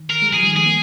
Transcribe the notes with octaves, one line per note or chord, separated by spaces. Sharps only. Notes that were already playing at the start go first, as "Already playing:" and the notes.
Already playing: D#3
A#4
G#3
G3
F3 G#4
D#3 G3
G#3 G#4
A#3